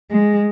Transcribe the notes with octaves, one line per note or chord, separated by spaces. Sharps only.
G#3